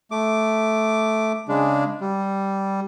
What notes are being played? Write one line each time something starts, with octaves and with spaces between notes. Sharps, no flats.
A3 D6
C#3 G#3 D4
G3